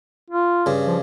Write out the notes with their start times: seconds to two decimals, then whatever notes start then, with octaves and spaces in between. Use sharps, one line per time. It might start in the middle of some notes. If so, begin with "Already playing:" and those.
0.30 F4
0.66 G2 C#3
0.87 F3